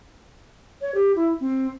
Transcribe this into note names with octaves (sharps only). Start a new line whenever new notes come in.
C#5
G4
E4
C4